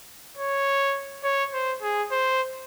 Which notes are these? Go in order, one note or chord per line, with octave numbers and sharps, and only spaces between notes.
C#5
C#5
C5
G#4
C5